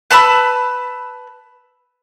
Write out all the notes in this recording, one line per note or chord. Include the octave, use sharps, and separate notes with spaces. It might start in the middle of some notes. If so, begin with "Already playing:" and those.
B4 A5 B5 E6